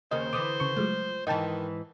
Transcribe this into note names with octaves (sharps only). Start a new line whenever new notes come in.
D#2 C#3 A#3 C5 D#5
D3 E3 D6 D#6
C#3 C#6
F3 F#3 G#3 A3
G#2 D#3 E3 D#5 G5 A5